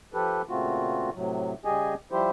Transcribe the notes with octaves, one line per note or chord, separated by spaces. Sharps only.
F3 G4 A4 B4
A#2 C#3 A3 C4 F4 F#4
A2 C3 F#3
C#3 G3 G4 G#4 D#5 G#5
F3 G3 E4 G4 C5